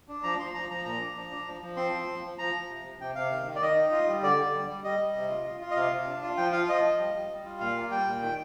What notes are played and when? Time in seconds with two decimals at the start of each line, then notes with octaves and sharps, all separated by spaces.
0.08 D4
0.23 F3 A#5
0.39 F3 C6
0.54 F3 A#5
0.70 F3 A#5
0.85 A#2 A#5
1.01 D4
1.16 F3
1.31 D4
1.46 F3
1.62 F3
1.77 C4 C6
1.93 F3
2.08 F3
2.24 F3
2.38 F3 A#5
2.54 F3
2.69 C3
2.85 C3
3.01 C3 G5
3.15 C3 F5
3.31 D#3
3.46 D#3
3.56 D5
3.62 D#3 D#5
3.76 D#4
3.92 F4
4.07 G3
4.22 D3 D5
4.38 D3
4.54 G3
4.69 G3
4.84 G3 D#5
5.00 G3
5.15 C3
5.30 F4
5.45 F4
5.61 F4
5.71 D#5
5.76 C3 F5
5.92 C3
6.07 D4
6.22 F4
6.37 F3 G5
6.53 F4 F5
6.68 F3 D#5
6.84 F3
7.00 G3
7.14 G3
7.30 G3
7.45 F4
7.60 A#2 F5
7.77 A#3
7.91 G3 G5
8.07 A#2
8.23 D#3